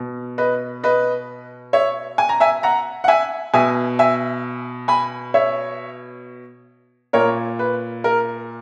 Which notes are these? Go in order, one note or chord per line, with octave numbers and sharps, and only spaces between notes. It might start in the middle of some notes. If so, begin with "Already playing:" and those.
Already playing: B2
B4 D#5
B4 D#5
C#5 E5
G#5
A#5
E5 G#5
F#5 A#5
F#5
E5 G#5
B2 E5 G#5
E5 G#5
G#5 B5
C#5 E5
A#2 A#4 C#5
B4
A#4